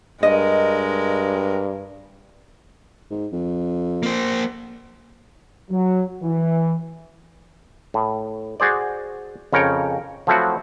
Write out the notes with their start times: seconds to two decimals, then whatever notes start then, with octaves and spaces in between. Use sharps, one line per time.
0.23 G2 G#3 A#4 D#5
3.10 G#2
3.32 F2
4.03 A#3 C5
5.70 F#3
6.21 E3
7.94 A2
8.60 F#4 G#4 C5 D5
9.53 F2 C#3 A#4 C#5 G5
10.27 F3 F#3 A3 C4 E4 F#4